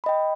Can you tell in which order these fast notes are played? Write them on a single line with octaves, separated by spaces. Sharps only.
B5 D#5 G5